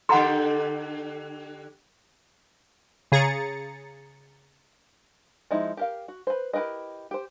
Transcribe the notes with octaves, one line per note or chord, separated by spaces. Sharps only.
D3 G4 A4 F#5 A#5 C6
C#3 G#4 A#5 A6 C#7
F3 G#3 D#4 E4
G4 A#4 F5
F#4
B4 C5
E4 G4 A#4 B4 D#5
G4 C5